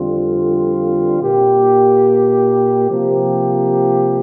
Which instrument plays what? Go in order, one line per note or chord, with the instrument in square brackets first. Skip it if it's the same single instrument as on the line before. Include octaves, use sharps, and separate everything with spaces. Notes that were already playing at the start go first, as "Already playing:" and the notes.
Already playing: [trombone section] F2 D3 G3 C4 F4
A#2 A#3 G4
C3 F3 A#3 G4